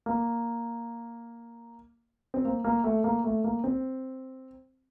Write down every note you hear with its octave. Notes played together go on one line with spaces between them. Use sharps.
A#3
C4
A#3
A#3
A3
A#3
A3
A#3
C4